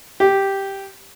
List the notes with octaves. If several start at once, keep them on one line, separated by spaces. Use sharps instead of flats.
G4